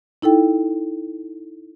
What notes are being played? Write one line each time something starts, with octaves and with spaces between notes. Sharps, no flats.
D#4 E4 A4 G5